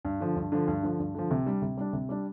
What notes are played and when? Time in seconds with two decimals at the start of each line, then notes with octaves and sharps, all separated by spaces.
0.05 G2
0.21 D3 F3
0.36 G2
0.52 D3 F3
0.68 G2
0.83 D3 F3
0.99 G2
1.15 D3 F3
1.31 C3
1.46 G3 D4
1.62 C3
1.77 G3 D4
1.93 C3
2.09 G3 D4